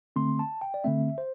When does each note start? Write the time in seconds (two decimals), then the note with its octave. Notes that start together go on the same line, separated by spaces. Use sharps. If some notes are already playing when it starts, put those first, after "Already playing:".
0.16 D3 A3 C4 C6
0.39 A5
0.61 G5
0.74 D5
0.84 D3 A3 C4 E5
1.18 C5